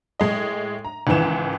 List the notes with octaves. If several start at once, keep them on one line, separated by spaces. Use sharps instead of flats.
A2 G#3 D#5
A#5
C#2 G#2 D#3 E3 E7